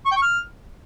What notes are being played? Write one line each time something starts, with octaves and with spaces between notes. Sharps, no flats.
C#6
G5
C#6
F6